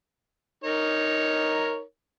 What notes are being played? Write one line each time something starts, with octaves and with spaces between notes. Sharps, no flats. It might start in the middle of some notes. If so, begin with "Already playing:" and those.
D#4 A#4 C#5